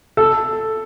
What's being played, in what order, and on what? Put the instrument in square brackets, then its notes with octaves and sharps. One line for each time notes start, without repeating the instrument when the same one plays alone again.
[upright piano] A4